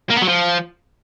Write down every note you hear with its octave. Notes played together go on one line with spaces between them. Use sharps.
A#3
B3
F#3
F3